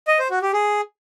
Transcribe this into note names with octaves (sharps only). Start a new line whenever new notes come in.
D#5
C5
F#4
G4
G#4